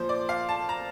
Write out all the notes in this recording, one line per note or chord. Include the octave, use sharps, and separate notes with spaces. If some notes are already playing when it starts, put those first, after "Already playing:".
Already playing: A#2 F3 C5
D5
F5
A5
A#5